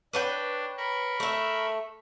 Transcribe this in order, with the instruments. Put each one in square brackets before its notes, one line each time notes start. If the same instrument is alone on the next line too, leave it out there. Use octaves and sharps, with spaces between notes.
[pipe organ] D4 [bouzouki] B4 C#5 G5
[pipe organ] A#4 B5 C#6
[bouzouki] A3 E5